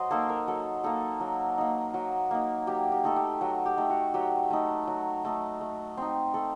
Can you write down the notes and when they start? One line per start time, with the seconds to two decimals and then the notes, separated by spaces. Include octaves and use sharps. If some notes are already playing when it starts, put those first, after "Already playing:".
Already playing: F#3 C5 D#5
0.11 A#3 D#4 A4
0.29 A#4
0.48 F#3 A4
0.84 A#3 D#4 A4
1.20 F#3
1.58 A#3 D#4
1.94 F#3
2.31 A#3 D#4
2.67 F#3 G4
2.92 G4
3.04 A3 D#4 A4
3.16 G4
3.41 F#3
3.66 G4
3.77 A3 D#4
3.90 F#4
4.14 F#3 G4
4.50 A3 D#4
4.87 F#3
5.25 A3 D#4
5.61 A3
5.97 C4 D#4
6.34 A3 A4